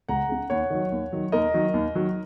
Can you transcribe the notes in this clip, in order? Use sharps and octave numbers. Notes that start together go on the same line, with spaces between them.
C#2 F#5 A#5
C#3 G#3
D#2 C#5 F#5
D#3 F#3
D#2
D#3 F#3
D#2 A#4 D#5
D#3 F#3
D#2
D#3 F#3